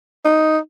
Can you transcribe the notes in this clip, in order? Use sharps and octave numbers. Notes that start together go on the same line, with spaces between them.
D#4